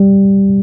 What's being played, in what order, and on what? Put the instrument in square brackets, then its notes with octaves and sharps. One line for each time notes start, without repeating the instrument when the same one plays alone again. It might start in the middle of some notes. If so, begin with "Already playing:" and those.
Already playing: [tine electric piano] G3